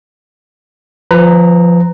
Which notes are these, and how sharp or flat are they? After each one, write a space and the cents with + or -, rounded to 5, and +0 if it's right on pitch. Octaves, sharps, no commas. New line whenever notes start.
F3 +0 B4 +20 A#5 -10